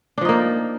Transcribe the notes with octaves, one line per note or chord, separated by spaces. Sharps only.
F3 A#3 D4 D#4